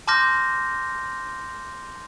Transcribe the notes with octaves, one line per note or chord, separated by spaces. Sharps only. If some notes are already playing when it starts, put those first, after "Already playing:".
A5 C6 D6 F6 G6 A#6